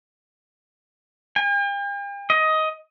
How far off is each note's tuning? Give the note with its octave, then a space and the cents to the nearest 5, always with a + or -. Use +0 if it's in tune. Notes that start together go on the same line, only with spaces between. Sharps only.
G5 +45
D#5 +15